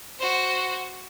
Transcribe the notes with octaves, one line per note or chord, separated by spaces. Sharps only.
F#4 C5